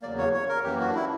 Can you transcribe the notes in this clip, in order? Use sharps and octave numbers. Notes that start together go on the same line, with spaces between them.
E2 C#3 F#3 A#3 D5
C#5
C#5
A#4
F#2 E3 A#3 G4
F#4
D4
E4